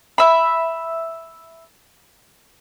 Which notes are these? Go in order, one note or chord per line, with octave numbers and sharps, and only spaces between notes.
E5 B5